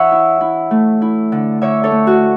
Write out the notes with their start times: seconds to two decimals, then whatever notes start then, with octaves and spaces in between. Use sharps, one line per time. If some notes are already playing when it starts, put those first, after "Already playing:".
Already playing: E3 C#5 E5 F#5
0.12 E4
0.41 E4
0.71 A3
1.02 E4
1.32 D3
1.62 D3 C#5 E5
1.84 A4 C#5
1.91 A3
2.07 F#4